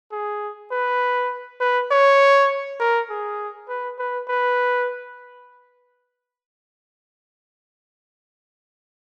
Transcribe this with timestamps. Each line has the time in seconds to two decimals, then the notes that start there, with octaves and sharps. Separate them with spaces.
0.12 G#4
0.71 B4
1.60 B4
1.91 C#5
2.80 A#4
3.10 G#4
3.69 B4
3.99 B4
4.28 B4